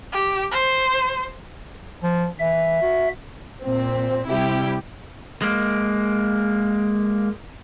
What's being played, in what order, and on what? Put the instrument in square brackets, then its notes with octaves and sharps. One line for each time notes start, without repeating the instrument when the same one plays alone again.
[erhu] G4
C5
[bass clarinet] F3
[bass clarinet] E3 [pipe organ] E5
[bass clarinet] F#4
[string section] A#2 C4
C3 G3 E4 G4
[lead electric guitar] G#3 A#3